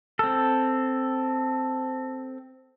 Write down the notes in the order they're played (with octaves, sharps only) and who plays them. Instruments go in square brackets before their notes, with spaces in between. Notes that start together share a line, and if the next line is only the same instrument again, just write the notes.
[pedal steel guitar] C4 A4